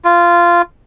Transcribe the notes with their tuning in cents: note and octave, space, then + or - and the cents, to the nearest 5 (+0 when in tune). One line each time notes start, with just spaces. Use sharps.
F4 -15